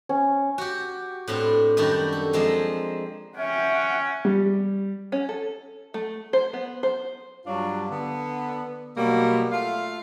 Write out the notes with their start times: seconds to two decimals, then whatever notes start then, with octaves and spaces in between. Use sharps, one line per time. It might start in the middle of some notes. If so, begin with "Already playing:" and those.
0.09 C#4
0.58 F#4 G4
1.28 A2 B3 C4 D4
1.77 F#2 D#3 G3 D4 F#4
2.12 A4
2.33 F3 G#3 A#3 C4
3.37 C#4 E5 F#5 G5
4.25 G3
5.12 C#4
5.29 A4
5.94 A3
6.33 C5
6.53 B3
6.83 C5
7.46 G2 F#3 D4 F4 C#5
7.91 D3 B3
8.97 B2 F#3 G3 A#3
9.51 A3 F4 F5